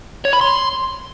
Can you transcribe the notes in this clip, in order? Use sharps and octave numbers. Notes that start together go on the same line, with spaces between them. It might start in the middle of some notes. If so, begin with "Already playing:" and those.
C#5
B5
C6